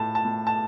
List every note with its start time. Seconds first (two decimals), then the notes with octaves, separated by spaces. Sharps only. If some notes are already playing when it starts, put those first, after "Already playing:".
Already playing: A2 A3 A5
0.15 A5
0.25 A2
0.47 A5